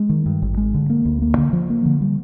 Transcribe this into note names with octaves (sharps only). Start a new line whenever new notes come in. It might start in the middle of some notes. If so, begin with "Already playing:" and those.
Already playing: G#3
D#3
G2
G#1
G#3
D3
A#3
D2
A#3
D3
F3
A#3
D3
G3